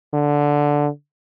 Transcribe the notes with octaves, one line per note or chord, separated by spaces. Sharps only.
D3